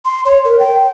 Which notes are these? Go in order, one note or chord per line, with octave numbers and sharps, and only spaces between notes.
C6
C#5
A#4
G5